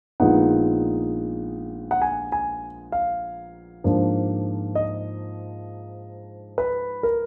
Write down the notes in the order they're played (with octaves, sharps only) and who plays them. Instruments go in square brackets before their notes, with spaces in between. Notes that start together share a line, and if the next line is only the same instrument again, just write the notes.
[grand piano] A#1 A#2 G#3 B3 D#4 F#5
F#5
G#5
G#5
F5
G#2 F3 A#3 D4
D#5
B4
A#4